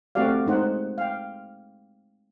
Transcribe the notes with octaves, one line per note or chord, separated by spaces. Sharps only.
A3 C4 F#4 G4 D5 F5
G#3 D#4 C5 F#5
F5 G5